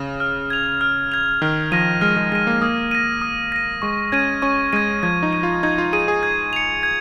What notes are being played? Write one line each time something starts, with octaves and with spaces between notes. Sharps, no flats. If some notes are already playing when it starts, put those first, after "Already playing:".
Already playing: C#3
F6
G#6 F7
F6
G#6 F7
D#3 F6
F3 A#6 D#7
G#3 F6
G#3
G#3 A#6 D#7
A#3
A#3 D#6
A#6 D#7
D#6
A#6 D#7
G#3 C#6
C#4 G#6 D#7
C#4 C#6
G#3 G#6 D#7
F3 G#6
D#4
D#7
F4
D#4 G#6
F4
G#4 D#7
G#4
G#6
C#7 F7
G#6